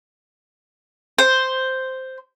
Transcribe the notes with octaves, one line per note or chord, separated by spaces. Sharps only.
C5